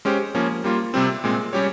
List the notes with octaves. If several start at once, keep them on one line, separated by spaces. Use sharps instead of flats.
G#3 C#4 G4 C5
F3 A#3 C#4
G3 A#3 F4
C3 G3 C4
A#2 G#3 C4
G3 C#4 G4 C#5